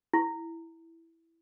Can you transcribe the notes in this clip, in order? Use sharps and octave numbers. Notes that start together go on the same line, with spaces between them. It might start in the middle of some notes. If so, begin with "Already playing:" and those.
E4